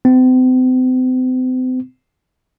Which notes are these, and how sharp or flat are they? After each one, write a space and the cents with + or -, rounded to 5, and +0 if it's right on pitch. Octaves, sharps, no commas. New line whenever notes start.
C4 -40